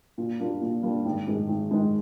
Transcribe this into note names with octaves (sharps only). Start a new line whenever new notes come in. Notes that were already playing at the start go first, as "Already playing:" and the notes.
A#2
G3 A#3 D4 F4
A#2
G3 A#3 D4 F4
G#1
G#2 D#3 G#3 D#4
G#1
G#2 D#3 G#3 D#4